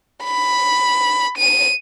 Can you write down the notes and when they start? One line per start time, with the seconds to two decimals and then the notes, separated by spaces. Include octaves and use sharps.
0.24 B5
1.38 D#7